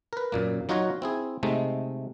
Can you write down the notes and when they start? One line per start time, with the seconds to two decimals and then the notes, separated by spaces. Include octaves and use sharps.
0.13 A#4 B4
0.32 F#2 A#2 A#3
0.69 F#3 D#4 F4 F#4 C#5 A#5
1.02 C4 E4 G#4
1.43 C3 G#3 A3 D#4